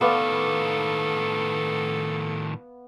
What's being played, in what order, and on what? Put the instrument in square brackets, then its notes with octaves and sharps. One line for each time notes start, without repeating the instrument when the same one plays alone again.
[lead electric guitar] A2 D#3 [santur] B3 D5 F5 [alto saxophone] A4